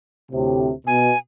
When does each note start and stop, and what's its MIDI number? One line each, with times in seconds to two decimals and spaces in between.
0.31 0.71 38
0.31 0.71 45
0.31 0.71 48
0.87 1.11 47
0.87 1.18 80